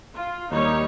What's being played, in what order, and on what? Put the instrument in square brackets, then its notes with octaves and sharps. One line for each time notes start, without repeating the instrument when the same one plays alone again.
[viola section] F4
[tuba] D#2 [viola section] G3 D#4 C#5